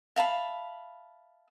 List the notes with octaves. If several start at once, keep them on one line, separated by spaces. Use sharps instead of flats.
E5 F5 A5 B5